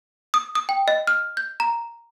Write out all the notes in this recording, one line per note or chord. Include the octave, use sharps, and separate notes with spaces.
D#6
D#6
G5
D#5
F6
G6
A#5